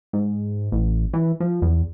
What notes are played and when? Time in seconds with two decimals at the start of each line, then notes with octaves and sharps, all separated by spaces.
0.13 G#2
0.72 A1
1.13 E3
1.40 F3
1.62 E2